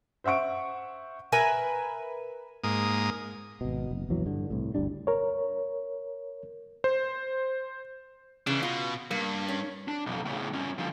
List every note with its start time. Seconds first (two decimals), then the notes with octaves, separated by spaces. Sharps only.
0.24 C5 E5 F#5 C#6 D7
1.32 A#4 B4 E5 G#5
2.64 G#2 A#3 D#6
3.61 G#1 B2
3.91 F#1
4.09 A#1 E2 E3 F#3
4.26 G2 D3
4.50 C2 A2
4.75 G1 D2 G3 D4
5.07 A#4 C#5
6.84 C5
8.47 C#3 E3 D4
8.63 B2 F4
9.11 G2 A#3
9.48 C#4
9.88 D4
10.06 B1 F2
10.25 A2 C#3
10.53 G2 C#4
10.78 D3 F3